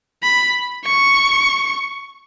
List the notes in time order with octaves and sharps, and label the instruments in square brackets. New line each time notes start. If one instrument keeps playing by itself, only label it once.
[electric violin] B5
C#6